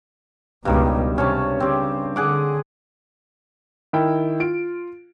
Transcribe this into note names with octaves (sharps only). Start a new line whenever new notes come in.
C#2 G2 B2 D#3 G3
C3 C#4 C#5 A5
C#3 C4 G4
D3 G#4 F#5 D6
D#3 E4 G5
F4 D7